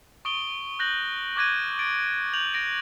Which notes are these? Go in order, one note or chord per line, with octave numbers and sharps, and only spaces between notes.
C#6 D#6 D7 G7
F#6 G6 A#6 F#7
C#6 D6 F#6 G#6 A#6 D#7
A6 D7
G6 F7 F#7
A#6 D7